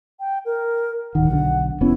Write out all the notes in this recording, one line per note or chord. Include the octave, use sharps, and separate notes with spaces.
G5
A#4
D1 D#3 F#5
B1 D3
F1 B3 C#4 E4